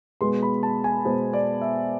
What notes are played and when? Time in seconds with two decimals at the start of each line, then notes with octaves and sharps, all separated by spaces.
0.21 B2 G#3 B3 C6
0.43 B5
0.63 A5
0.84 G#5
1.05 B2 G#3 B3 C5
1.33 D5
1.61 E5